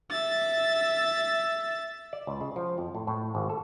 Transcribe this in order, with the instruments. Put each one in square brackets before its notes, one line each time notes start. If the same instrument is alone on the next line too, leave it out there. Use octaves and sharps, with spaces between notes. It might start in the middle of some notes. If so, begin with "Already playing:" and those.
[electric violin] E5 A6
[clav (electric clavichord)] D5
C#2
C#3
F3
F2
A2
A2
G#1
A4